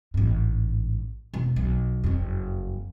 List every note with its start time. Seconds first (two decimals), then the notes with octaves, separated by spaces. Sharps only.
0.14 A1 G#2
1.34 E1
1.56 B1
2.04 F#1 F2